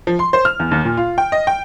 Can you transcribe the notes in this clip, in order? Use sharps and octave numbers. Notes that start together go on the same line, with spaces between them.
F3
C6
C5
F6
E2
D#2
A#2
F4
G5
D#5
G5